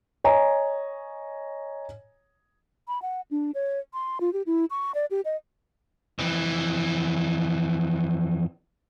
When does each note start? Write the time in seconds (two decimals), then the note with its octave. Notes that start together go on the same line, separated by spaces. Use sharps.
0.24 C#5 D#5 G#5 A#5
2.88 B5
3.02 F#5
3.31 D4
3.54 C#5
3.93 C6
4.20 F4
4.33 G4
4.46 E4
4.70 C#6
4.95 D5
5.11 G4
5.25 D#5
6.19 F2 E3